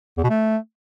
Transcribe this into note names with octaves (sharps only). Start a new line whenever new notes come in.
E2
B2
A3